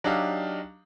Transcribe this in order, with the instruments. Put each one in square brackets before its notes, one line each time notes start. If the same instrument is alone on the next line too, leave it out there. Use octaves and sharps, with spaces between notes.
[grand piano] F#3 D4 D#4 G4 F5